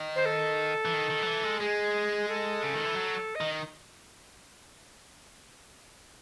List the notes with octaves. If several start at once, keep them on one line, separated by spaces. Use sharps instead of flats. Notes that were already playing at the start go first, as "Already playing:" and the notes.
Already playing: D#3
C5
A4
E3
D#3
D#3
F#3
E3
G#3
G#3 G#4
A4
C#3
D#3
E3
F#3
D#5
D#3